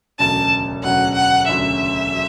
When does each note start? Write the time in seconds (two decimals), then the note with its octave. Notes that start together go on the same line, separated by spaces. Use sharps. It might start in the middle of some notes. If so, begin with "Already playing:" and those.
0.19 E1 D2 C#3 F#3 C#4 A5
0.83 E1 D2 C#3 F#3 C#4 F#5
1.15 F#5
1.48 E1 D2 C#3 F#3 C#4 E5
2.13 F#3